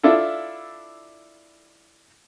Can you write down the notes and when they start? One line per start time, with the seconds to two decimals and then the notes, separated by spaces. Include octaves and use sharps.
0.03 D4 E4 F4 A4